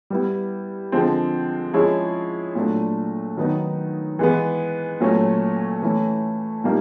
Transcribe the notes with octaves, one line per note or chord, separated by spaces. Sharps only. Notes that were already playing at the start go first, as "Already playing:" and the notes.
G3 B3 E4
D3 F3 G#3 C4
F3 G#3 C#4 E4 G#4
A#2 F#3 A3 D4
D#3 F#3 B3 D#4
E3 G#3 B3
A#2 F#3 A3 C#4
E3 A3 C#4 E4
A#2 G3 A#3 D#4